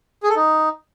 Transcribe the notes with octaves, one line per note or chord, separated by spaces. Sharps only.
G#4
A4
D#4